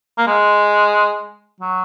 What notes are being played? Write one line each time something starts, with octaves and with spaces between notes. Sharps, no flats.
A#3
G#3
F#3